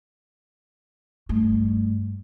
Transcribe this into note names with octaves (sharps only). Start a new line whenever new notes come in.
G2 A3